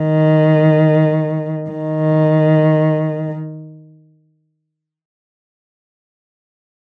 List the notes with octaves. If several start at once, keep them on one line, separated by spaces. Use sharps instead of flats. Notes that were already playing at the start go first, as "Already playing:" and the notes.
Already playing: D#3
D#3